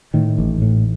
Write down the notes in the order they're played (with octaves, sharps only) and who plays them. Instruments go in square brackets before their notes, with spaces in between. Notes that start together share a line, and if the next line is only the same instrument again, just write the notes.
[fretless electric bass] A2 D#3
A1
A2